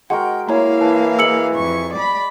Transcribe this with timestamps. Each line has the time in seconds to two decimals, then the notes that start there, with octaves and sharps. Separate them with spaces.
0.10 G#3 F#4 A#4 F#5 G5
0.49 A#3 E4 C#5 F5 G#5 A#5
0.81 E3 A5
1.19 G#4 D#5 E6 C#7 F#7
1.54 F2 C#6
1.93 D5 B5